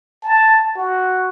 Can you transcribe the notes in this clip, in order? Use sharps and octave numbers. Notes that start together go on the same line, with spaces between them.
A5
F#4